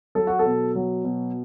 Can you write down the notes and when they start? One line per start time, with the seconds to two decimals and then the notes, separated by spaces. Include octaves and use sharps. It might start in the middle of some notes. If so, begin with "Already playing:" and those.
0.15 F#3 A4
0.27 F#4
0.39 A4
0.46 B2
0.75 F#3
1.04 B2